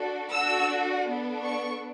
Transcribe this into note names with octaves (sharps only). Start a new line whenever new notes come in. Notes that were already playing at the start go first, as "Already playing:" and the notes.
Already playing: D4 F#4 A4
D4 F#4 A4 E6
B3 D4 A4
C#6